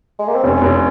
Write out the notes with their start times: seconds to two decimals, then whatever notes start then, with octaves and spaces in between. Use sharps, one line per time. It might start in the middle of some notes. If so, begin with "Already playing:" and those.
0.19 G#3
0.28 A#3
0.35 C4
0.43 F1 C#4
0.61 F1
0.71 C#4